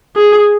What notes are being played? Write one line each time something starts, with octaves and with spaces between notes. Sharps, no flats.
G#4